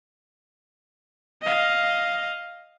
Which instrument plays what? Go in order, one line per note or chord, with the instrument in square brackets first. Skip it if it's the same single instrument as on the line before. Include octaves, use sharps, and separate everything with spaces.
[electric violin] D#5 F5